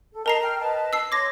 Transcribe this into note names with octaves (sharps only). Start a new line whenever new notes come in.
A4
A#4 D#5 A5 A#5 C7
G5 F6
B4 D#5 A5
E6 C7
C#5 C6 D6 G#6 A#6